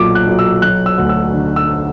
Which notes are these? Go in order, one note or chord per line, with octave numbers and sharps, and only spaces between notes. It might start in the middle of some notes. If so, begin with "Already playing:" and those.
Already playing: B1 A#2 F#3 D6
F#6
B1
E6
F#3 F#6
E6
D2
E6
D3
E6